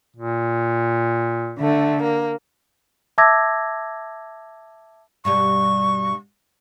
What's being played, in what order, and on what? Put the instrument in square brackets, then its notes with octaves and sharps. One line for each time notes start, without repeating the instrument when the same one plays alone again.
[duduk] A#2
[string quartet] D3 A3
A#3
[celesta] E5 A5 D6 E6 G#6 A#6
[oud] G2 B2 G3 [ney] C#6